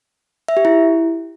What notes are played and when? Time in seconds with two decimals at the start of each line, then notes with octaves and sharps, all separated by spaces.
0.48 E5
0.57 G4
0.65 E4